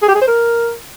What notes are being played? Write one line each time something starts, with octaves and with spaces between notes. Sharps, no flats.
G#4
G4
G#4
C5
A#4